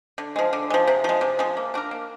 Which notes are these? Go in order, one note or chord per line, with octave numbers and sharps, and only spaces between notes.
D3
F3 G#3
D3
F3 G#3
C3
F3 G#3
C3
F3 G#3
A#3
D4 F#4 A#4
A#3